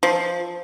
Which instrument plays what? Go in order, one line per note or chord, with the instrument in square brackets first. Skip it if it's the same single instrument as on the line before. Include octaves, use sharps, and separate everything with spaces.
[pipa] F3